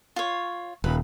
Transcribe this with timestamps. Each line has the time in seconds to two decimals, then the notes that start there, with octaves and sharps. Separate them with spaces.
0.16 F4 C#5
0.84 D#1 B4